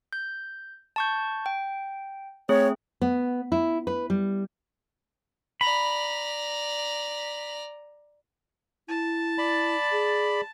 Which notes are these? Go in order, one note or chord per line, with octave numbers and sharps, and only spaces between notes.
G6
A5 C#6 G6
G5
A3 C4 G#4 C#5
B3
E4
B4
G3
D5 A#5 B5
E4 A5
D5 B5
G#4